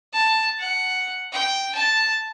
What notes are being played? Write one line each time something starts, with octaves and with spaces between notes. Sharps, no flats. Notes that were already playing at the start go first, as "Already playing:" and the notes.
A5
F#5
G5
A5